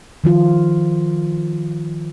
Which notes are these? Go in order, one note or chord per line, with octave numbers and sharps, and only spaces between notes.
D#3 F3 F4